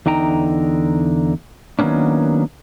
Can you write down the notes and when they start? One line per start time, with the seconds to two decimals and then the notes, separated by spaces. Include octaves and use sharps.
0.06 E2 D3 D#4 G5 A#5
1.79 D#3 F#3 A#3 B3 C#4 D4